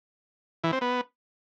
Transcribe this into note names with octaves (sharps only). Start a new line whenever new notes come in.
E3
C4
B3